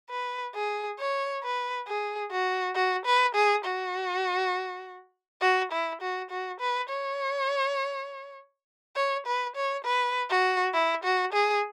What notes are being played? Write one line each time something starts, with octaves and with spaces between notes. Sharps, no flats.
B4
G#4
C#5
B4
G#4
F#4
F#4
B4
G#4
F#4
F#4
E4
F#4
F#4
B4
C#5
C#5
B4
C#5
B4
F#4
E4
F#4
G#4